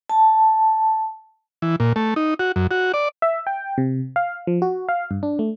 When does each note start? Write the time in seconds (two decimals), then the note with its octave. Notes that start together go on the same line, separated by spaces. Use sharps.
0.10 A5
1.62 E3
1.80 A#2
1.96 A3
2.16 D#4
2.39 F#4
2.56 F#2
2.71 F#4
2.94 D5
3.22 E5
3.47 G5
3.78 C3
4.16 F5
4.47 F3
4.62 F#4
4.89 F5
5.11 G2
5.23 D4
5.39 A3